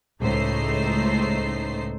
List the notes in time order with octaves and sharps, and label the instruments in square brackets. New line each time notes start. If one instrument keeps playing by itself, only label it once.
[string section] C#2 A2 A3 D#4 C5 C7